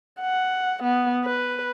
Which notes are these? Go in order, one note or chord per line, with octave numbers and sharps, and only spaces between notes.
F#5
B3
B4